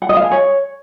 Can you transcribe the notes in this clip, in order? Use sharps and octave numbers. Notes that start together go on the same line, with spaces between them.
F#5
D#5
F5
G#5
C#5